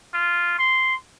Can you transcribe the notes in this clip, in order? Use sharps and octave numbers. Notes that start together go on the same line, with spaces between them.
F4
C6